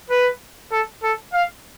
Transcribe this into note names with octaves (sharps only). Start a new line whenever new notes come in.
B4
A4
A4
F5